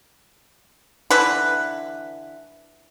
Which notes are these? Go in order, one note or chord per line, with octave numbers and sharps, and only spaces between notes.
D3 E3 B4